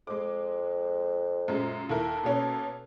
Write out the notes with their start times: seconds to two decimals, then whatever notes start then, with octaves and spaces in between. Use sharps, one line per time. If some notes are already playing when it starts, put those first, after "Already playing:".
0.07 F2 G#3 D6
1.48 F#2 A#2 G#3
1.89 D#2 E4 A4 A#4
2.23 B2 A#3 C#4